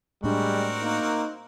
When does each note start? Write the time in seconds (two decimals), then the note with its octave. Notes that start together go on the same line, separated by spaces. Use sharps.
0.24 A2 G3 G#3 C4 D4 F#4 A#4
0.82 A#3 D#4